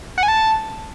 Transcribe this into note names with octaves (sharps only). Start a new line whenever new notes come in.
F#5
G#5
A5